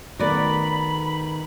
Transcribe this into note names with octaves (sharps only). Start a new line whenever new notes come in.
D#3 A3 B3 F#4 D5 B5